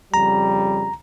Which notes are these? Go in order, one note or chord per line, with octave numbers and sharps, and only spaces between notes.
F2 C#3 G3 A#5